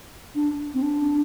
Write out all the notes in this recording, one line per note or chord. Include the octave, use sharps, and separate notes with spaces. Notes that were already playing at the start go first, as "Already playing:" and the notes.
D4
C4
D4